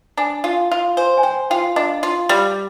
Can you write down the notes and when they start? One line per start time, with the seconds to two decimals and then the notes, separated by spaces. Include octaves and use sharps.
0.17 D4 G#5
0.44 F4
0.72 F4
0.97 C5 G#5
1.18 G#5
1.23 C5 G5
1.50 F4 G5
1.76 D4 D#5
2.03 F4
2.29 G3